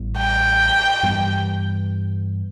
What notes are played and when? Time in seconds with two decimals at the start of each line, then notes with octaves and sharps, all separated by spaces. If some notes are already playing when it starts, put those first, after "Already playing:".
Already playing: A1 A2 G3 B3
0.17 G5
1.03 G2 E3 G3 B3